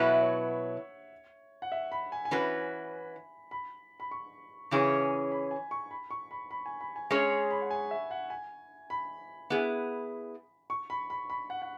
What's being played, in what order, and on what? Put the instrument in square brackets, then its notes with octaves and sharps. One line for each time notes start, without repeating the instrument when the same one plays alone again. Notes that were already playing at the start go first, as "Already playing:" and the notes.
Already playing: [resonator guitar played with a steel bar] B2 F#3 E4 B4 [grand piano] F#5
[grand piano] E5
C#5
F#5
E5
B5
G#5
G#5
[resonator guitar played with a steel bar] E3 C#4 F#4 B4 [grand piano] B5
[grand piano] B5
B5
C#6
[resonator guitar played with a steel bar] C#3 E3 C#4 G#4 C#5 [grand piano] B5
[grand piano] G#5
B5
G#5
C#6
B5
C#6
B5
B5
G#5
B5
G#5
[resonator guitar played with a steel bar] G#3 C#4 G#4 C#5 [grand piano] G#5
[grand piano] C#6
B5
F#5
G#5
E5
F#5
G#5
B5
[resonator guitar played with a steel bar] B3 E4 G#4
[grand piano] C#6
B5
B5
B5
F#5
F#5